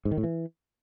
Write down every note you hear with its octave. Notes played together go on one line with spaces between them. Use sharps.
G#2
D#3
A2
E3